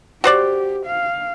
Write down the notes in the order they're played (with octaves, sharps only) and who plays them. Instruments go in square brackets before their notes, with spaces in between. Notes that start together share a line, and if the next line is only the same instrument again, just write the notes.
[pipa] F#4 C5 D5 [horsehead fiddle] G4
[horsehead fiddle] F5